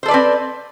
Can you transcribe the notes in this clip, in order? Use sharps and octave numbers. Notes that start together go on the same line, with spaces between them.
C4 A4 B4 C5 D5